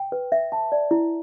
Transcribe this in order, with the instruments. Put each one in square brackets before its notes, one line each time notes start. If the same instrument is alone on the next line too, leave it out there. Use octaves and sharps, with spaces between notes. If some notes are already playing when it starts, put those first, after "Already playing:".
Already playing: [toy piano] G5
B4
E5
A5
D5
E4